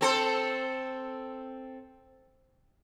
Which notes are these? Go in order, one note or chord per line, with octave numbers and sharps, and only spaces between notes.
C4 A4 C5